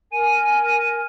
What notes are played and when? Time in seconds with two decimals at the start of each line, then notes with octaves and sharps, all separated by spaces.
0.12 A#4 G#5 D#7